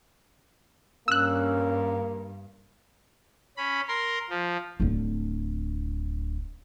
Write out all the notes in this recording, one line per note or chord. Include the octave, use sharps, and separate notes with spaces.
G2 A#3 C#4 E6 F#6
C#4 B5
A#4 C6
F3
D1 D4